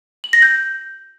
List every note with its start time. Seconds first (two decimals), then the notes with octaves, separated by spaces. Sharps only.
0.24 F#7
0.33 A#6
0.42 G6